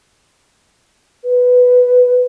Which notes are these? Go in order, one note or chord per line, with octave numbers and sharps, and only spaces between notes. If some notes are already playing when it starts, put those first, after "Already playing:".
B4